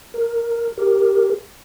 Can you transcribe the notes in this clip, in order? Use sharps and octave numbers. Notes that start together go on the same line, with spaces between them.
A#4
G4 A#4